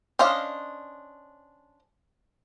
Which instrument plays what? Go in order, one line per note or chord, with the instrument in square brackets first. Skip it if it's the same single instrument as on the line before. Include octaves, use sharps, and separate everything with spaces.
[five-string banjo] C#4 D4 C5 D#5 F5